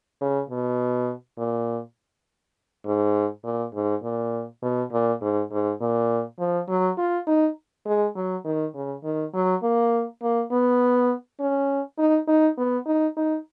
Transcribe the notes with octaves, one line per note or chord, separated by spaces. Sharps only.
C#3
B2
A#2
G#2
A#2
G#2
A#2
B2
A#2
G#2
G#2
A#2
F3
F#3
F4
D#4
G#3
F#3
D#3
C#3
D#3
F#3
A#3
A#3
B3
C#4
D#4
D#4
B3
D#4
D#4